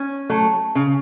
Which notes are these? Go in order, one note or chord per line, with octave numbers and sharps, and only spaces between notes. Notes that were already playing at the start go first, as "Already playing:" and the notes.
Already playing: C#4
F#3 A3
C#3